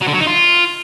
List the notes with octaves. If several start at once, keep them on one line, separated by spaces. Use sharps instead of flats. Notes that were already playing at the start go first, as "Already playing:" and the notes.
F#3
D3
F#3
D#4
F4